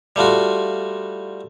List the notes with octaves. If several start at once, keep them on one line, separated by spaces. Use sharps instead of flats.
G3 A3 F4 F#4